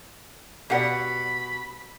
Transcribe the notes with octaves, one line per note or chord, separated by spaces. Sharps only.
B2 G4 B4 D5 F#5 B5